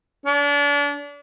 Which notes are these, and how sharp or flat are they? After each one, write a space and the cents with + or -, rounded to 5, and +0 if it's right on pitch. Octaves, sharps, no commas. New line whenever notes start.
D4 -35